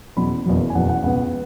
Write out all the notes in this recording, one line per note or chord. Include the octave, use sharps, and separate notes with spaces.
E2 B2 F#3 C#4 B5
F#1 E2 B2 F#3
G#5
F#1 E2 B2 F#3 F#5
F#5
C#2 B2 B3 F#5